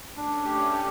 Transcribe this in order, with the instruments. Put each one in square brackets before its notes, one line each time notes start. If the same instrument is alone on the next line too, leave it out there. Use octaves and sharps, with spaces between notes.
[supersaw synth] A3 C#4 [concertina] D4
[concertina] G4
G4